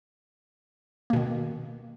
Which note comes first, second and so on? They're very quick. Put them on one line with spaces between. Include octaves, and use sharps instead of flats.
A#3 B2 D#3